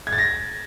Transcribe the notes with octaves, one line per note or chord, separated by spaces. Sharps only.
G#6
A6
A#6